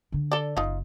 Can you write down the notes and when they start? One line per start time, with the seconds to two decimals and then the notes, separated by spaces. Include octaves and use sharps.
0.12 D3 D4
0.32 A4 D5
0.57 F#1 D#4 F4